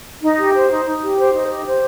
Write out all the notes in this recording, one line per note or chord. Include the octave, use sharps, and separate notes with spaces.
D#4
G4
C5
D#4
D#4
G4
C5
D#4
G4
C5